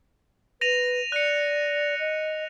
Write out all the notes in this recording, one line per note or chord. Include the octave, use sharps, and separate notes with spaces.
B4 A#6 D#7 F7
D5 F#6 C#7
D#5